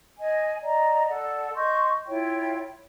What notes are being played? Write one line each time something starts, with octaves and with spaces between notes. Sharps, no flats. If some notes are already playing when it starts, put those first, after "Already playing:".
D#5 G#5
D5 D#5 A#5
A4 D5 F#5
D#5 C6 C#6 G6
E4 F4 C#5 G5